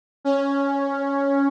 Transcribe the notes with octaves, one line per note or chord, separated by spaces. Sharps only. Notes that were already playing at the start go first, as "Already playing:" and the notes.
C#4